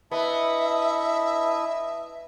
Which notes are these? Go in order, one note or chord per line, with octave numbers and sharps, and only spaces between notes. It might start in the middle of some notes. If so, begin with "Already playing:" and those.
B3 D4 E4 D#5 E5